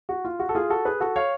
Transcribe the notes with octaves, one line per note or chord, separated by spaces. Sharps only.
F#4
F4
F#4
A4
F4 G#4
F#4 A4
G#4 B4
F#4 A4
C#5 F5